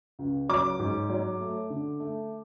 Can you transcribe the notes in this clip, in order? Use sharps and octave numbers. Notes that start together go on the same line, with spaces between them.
C#2
F#3 D6
G#2
F#3
A3
D3
A3